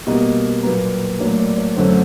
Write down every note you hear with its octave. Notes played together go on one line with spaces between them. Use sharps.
B2 G3 A#3 D#5
A#2 F#3 A#3 B4
A2 F#3 A#3 D4 C#5
D5
C#5
F#2 D3 F#3 A3 C#4 C5